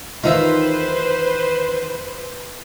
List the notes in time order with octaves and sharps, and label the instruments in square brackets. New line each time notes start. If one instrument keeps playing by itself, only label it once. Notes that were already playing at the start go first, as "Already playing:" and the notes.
[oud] E2 D#3 D#4 [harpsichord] F4 E5 [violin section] B4 C5